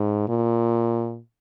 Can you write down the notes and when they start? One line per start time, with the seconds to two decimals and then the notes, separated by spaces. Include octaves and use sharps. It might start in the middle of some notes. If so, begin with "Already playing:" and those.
Already playing: G#2
0.29 A#2